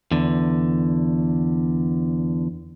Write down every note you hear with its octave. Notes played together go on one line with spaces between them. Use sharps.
E2 D3